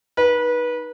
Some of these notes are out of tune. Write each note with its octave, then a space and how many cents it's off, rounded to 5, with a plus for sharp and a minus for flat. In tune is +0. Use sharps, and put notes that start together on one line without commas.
D#4 +0 B4 -25